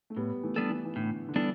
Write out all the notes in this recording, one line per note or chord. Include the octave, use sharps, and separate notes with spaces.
A3
A2 G3 B3
E3 A3
G3 B3 D4 A4
E3
E3
A2 D3
D3
E3 G3 B3 D4 A4